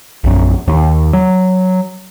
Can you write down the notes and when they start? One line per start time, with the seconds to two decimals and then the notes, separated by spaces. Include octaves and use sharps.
0.24 A#1 F#2
0.68 D#2
1.13 F#3